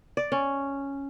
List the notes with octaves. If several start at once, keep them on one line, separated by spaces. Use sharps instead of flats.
D5
C#4